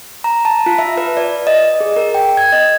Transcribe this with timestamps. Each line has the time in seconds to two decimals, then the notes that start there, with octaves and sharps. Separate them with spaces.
0.24 A#5
0.45 A5
0.66 F4
0.78 E5
0.97 B4
1.17 D5
1.47 D#5
1.80 G#4
1.96 A#4
2.14 G5
2.37 G#6
2.52 D#5